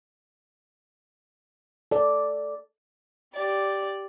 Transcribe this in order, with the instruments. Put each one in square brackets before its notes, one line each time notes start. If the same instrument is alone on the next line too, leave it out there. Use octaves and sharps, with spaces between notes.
[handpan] A4 D5
[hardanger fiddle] G4 D5